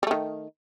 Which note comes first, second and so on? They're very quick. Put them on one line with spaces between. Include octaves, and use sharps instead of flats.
G3 A3 D#3